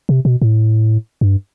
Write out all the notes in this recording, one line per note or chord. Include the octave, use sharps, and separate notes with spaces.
C3
B2
A2
G2